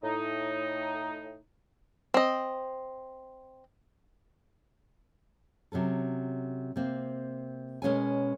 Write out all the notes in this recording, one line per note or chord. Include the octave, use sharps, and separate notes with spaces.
A2 D#4
C4 D#5
C3 F#3 C#4 A4
C3 A#3 C4
B2 G#3 C#4 A#4 C#5 G#5